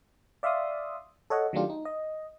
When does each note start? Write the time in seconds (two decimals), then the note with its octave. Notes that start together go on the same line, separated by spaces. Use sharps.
0.43 D5 E5 F5 C6 D#6
1.30 A4 C#5 D#5 F#5
1.53 D#3 F#3 A3 D4 F4 G4
1.70 D#4
1.85 D#5